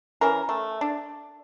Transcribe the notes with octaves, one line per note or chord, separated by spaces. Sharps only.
E3 C#4 A#4
A3
D4